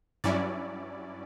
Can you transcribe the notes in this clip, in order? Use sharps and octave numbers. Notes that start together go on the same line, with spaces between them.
G2 F#3 C#4 E4 D5